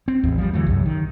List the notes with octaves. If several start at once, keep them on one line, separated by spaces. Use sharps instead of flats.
C4
A1 E2
F3 G3
D3 E3 F#3 A3
C2 F#2
D#3